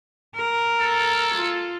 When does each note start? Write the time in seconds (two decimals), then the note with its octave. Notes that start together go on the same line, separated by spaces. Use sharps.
0.35 A#4
0.80 A4
1.35 F4